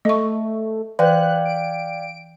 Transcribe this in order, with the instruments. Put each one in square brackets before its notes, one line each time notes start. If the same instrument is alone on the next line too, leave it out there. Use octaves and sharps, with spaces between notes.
[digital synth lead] A3 [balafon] D#5 C#6
[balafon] E3 B4 [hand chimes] D5 F5 G5 [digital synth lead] F#6
[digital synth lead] D7